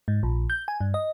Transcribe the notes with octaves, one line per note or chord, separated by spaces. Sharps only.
G#2
A#1
G6
G#5
G2
D#5